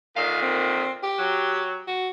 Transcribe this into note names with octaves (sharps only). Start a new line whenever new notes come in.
A#2 D3 D#3 F5
C4
G4
F#3
F#4